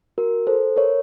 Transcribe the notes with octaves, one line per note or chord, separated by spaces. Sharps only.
F#4 A#4
A4 C5
A#4 C#5